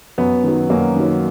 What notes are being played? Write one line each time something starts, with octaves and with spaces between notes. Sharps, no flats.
F#2 B3
D#3 F#3
F#2 A#3
D#3 F#3